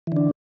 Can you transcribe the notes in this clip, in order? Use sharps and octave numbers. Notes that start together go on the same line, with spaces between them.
D3 E3 D4